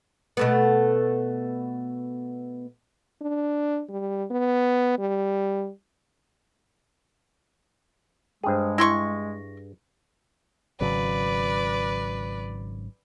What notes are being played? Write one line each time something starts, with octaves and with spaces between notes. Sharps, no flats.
B2 A3 B3
D4
G3
B3
G3
G2 G#3 G#4 C5 G5
E4 C6 C#6 A#6
G#1 C#3 F#3 B4 D5